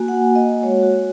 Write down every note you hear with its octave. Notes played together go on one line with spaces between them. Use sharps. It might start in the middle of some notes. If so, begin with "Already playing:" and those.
Already playing: A#3 F#4 G#5
F#5
D#5
G#3 F#4 C#5
F#4